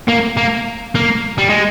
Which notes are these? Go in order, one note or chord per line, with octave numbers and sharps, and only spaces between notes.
A#3
A#3
A#3
G3
G#3